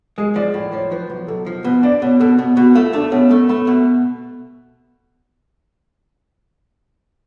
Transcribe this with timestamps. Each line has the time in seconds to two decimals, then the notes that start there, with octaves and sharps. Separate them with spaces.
0.18 G#3 G#4
0.36 F3 D5
0.54 A2 D5
0.73 F3 C#5
0.92 F3 B4
1.10 B1
1.28 B1 A4
1.46 F3
1.64 B2 B4
1.83 D4 D5
2.02 B2 C#5
2.20 B2 A4
2.39 B2
2.57 B2 F#4
2.75 A3 F4
2.93 A3 D4
3.12 B2 C#4
3.31 A3
3.49 A3 B3
3.67 B2